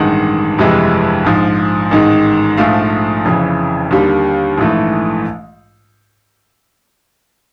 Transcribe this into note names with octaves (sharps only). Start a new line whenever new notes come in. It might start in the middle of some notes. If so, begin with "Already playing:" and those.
Already playing: A1 G2 D#3 G#3 F#5
G1 F2 C3 E3 G#3
A#1 G#2 F3
A1 G#2 D#3 G#3
A#1 G#2 F3 A3 F5
F1 F2 C#3 E3
D#2 D3 G3 A#3
A#1 G#2 E3 A3